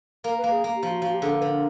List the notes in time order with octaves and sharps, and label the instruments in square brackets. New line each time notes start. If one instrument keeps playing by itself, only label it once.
[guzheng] A#3 [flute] A#4
[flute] B4
[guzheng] A#3
[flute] G#4
[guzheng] A#3
[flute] G4
[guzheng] F3
[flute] F#4
[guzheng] F3 [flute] F#4
[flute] G4
[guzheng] D3 [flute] G#4
[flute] A#4
[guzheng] D3 [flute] B4
[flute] A#4